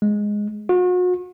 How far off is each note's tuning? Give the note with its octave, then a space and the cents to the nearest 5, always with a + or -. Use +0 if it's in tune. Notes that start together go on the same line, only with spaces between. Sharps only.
G#3 +0
F#4 -40